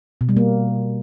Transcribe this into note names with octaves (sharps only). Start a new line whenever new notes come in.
B2
G3
A#3